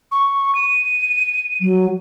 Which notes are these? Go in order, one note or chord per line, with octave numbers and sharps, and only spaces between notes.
C#6
D#7
F#3